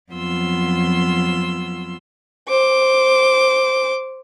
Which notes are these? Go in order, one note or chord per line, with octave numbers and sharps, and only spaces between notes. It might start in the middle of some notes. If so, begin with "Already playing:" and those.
F2 F#3 B3 F4 C6 E6
C5 D6